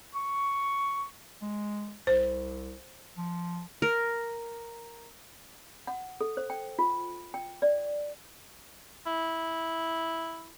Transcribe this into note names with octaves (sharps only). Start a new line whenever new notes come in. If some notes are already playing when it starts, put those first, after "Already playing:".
C#6
G#3
C2 C5
F3
A#4
F#5
A4
C5
G5
F4
G5
D5
E4